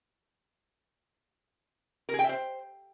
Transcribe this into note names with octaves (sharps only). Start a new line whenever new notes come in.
A#4
G#4
G5
E5
C5